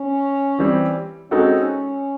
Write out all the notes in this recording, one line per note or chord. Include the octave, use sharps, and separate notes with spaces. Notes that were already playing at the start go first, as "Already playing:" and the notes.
Already playing: C#4
E3 G3 C4
G#3 C4 C#4 D#4 F#4 A4